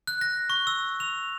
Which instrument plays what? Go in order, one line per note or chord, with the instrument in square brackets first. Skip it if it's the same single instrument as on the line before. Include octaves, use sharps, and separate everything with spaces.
[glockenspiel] F#6
A#6
C#6
E6
F7